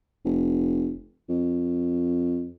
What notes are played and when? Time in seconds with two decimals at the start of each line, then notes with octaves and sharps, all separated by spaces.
0.25 F1
1.29 F2